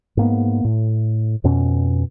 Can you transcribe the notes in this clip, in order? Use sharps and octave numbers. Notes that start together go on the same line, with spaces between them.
G#2 A#3 B3
A2
F2 B2 C#4